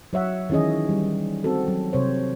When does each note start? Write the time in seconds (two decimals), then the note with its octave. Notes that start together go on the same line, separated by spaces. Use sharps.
0.13 F#3 C#5 E5 F#5
0.50 D#3 E3 C#4 G#4 D#5
0.89 G3
1.44 C4 F#4 A4
1.68 F#3
1.93 C3 C5 C#5